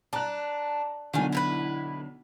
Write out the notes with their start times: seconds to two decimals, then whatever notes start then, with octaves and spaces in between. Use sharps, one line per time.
0.13 D4 A5 A#5 F#6
1.14 B1 D3 D#3 F4 G#5
1.32 E4 A#4 B4